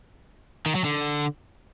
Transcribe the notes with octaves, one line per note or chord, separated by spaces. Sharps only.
D#3
F#3
D3